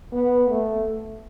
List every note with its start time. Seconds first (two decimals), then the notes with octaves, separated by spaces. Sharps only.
0.12 B3
0.49 A3